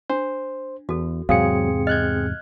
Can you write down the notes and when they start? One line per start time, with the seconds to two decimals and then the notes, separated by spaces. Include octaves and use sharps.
0.10 D4 C5
0.89 E2 F#4 A4
1.29 E2 G#2 C3 F#3 C4 G#4 F5 C#7
1.87 D#5 F6 F#6 G#6